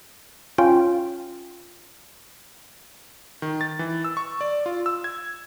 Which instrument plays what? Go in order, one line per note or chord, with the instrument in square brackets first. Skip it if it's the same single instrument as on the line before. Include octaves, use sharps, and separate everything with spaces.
[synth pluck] C#4 F4 G5
[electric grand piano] D#3
A6
E3
E6
C#6
D5
F4
E6
G#6